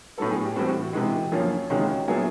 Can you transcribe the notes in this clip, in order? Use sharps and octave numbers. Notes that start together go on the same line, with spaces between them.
A2 F#3 B3 A4
G#4
G4
A2 E3 G3 C4 F#4
F#4
C3 E3 G#3 F#4
F#2 C#3 F3 A#3 C#4
C#2 C3 D#3 G#3 C#4 F#4
A#2 F#3 B3 E4 G#4